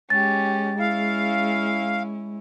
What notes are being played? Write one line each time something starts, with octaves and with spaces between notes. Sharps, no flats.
G#3 C#4 G4 A6
C#4 E4 F5